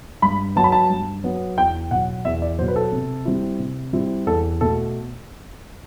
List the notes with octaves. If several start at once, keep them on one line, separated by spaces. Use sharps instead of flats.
G2 B5
F#3 B3 A5
B5
A5
G2
F#3 B3
E2 G5
B2 F#3 F#5
E2 E5
D5
B2 F#3 C5
B4
A4
C3
G3 C4 E4
C3
G3 C4 E4
E2 A4
B2 A3 A4